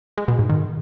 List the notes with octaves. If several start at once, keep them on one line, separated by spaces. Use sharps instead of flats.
G#3
B2
G#2
D#3